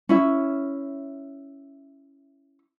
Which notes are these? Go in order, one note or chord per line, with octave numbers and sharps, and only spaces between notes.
C#4 E4 E5